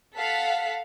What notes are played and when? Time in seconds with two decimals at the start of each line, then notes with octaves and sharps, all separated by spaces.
0.16 A4 F5 F#5 B6